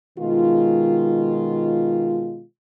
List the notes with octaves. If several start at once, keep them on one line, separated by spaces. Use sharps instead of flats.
B2 D#3 G#3 F4